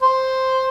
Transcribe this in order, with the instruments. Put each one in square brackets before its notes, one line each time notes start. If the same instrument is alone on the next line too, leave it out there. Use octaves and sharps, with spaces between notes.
[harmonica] C5